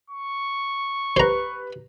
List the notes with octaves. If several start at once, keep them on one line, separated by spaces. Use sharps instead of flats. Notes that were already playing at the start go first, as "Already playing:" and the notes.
C#6
G4 B4 C5 A#5